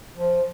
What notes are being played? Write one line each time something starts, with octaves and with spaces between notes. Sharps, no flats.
F3